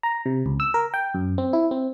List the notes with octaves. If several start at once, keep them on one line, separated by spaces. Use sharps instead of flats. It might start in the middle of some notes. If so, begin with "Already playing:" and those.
A#5
C3
C#2
E6
A#4
G5
F#2
C4
E4
C4